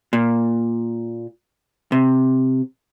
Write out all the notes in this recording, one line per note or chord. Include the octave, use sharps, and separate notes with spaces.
A#2
C3